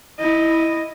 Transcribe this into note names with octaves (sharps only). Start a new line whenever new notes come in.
E4 D#5